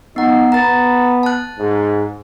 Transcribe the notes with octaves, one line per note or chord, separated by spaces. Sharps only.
B3 D#4 F#5
B3 A#5 A6
A5 F#6
G#2